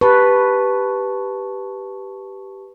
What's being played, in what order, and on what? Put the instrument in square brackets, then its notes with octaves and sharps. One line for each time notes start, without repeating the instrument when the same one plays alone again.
[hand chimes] G4 A5 C#6 [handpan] B4